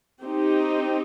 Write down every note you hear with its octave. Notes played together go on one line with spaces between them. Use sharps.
C4 D#4 G4